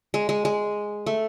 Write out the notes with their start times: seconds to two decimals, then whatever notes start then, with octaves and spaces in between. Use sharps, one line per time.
0.14 G#3
0.29 G#3
0.45 G#3
1.06 A3